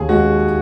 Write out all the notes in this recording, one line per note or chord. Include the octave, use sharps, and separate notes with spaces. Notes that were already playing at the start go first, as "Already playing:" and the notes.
Already playing: D#2 G#4
G#3 F#4